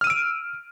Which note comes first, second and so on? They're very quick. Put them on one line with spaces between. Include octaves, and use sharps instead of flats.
F6 D#7 E6 D7